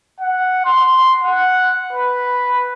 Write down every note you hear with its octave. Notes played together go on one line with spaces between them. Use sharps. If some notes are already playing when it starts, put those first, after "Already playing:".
F#5
C6
F#5
B4